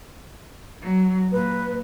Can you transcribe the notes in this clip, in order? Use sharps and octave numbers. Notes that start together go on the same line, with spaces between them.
F#3
A#2 B4